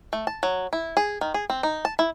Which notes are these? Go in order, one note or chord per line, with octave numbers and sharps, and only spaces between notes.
A3
A5
F#3
E4
G#4
D#3
G#4
C4
D#4
A5
E4